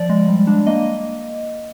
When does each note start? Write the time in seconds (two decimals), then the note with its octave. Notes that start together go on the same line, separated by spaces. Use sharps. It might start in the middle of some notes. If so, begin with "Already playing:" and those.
Already playing: F3 D5
0.09 G#3
0.28 G3
0.47 D4
0.67 A#3 D#5